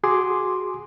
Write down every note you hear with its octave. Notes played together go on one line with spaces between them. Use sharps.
F#4 G#4 C6 D6